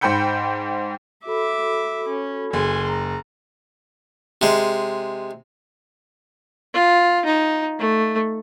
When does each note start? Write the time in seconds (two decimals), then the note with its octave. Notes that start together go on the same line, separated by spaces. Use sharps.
0.01 G#2 C5 G5 B5 G6 C#7
1.25 F#4 A4 E5 B5 D6
2.09 C#4
2.53 F#1 G#5 C6
2.88 A#5
4.42 C3 G#3
6.74 F4
7.25 D#4
7.79 A3